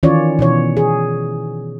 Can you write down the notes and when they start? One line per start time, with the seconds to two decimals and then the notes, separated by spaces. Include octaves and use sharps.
0.03 D#3 E3 C#4 F4 C#5 D5
0.39 B2 E3 C#5
0.77 G#4